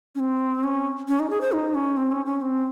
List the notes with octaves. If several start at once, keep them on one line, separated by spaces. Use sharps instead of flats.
C#4
C4
C#4
C#4
D#4
G#4
C5
D#4
C#4
C4
C#4
C#4
C4